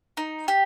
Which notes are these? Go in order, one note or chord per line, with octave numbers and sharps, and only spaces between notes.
D#4
G4